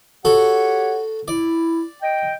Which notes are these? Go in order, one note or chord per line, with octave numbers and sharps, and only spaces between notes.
F#4 G4 A4 C#5 F#5
E4 D5
D#5 G5